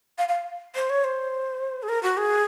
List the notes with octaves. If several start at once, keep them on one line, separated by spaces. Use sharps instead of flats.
F5
F5
C5
C#5
C5
G#4
A#4
F#4
G#4